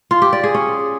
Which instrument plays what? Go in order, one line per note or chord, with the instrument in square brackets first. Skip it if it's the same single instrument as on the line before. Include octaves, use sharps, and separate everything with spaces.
[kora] F4
G4
D5
G#4
C#4